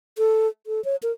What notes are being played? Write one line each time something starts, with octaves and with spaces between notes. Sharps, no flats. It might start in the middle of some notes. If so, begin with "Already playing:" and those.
A4
A4
C#5
A#4